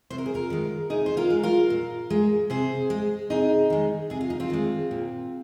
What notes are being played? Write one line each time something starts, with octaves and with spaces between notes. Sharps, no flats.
C3 C5
A#4
G#4
F4 A#4
D#3 G#3
C3 D#4 G#4
C5
F4 A#4
G#3
F4 A#4
A#2
G#3
C3 G#4 C5
G#3
C3 D#4 G#4
D#3 G#3
C3 G#4
F4
D#4
C4 F4
D#3 G#3
A#2